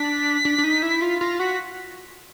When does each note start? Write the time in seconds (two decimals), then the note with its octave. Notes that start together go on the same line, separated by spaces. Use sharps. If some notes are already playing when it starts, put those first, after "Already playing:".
Already playing: D4 B6
0.45 D4
0.58 D4
0.64 D#4
0.83 E4
1.02 F4
1.10 B6
1.21 F4 A#6
1.39 F#4 B6